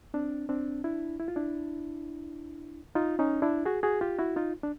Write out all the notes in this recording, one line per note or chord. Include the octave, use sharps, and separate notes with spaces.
C4 D4
C4 D4
D4 E4
E4
F4
D4 E4
D#4 F4
C#4 D#4
D4 E4
F#4 G#4
F#4 G#4
F4 G4
E4 F#4
D#4 F4
D4